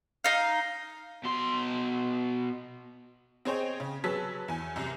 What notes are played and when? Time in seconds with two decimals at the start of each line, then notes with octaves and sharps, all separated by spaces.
0.24 D#4 F5
1.24 B2 C6
3.45 C4 G#4 C5 C#5 D#5 G5
3.80 C#3
4.04 F#3 G#4 B4 A5 E6 B6
4.48 E2 G#5
4.76 C2 F#2 C3